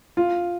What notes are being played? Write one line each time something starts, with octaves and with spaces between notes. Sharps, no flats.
F4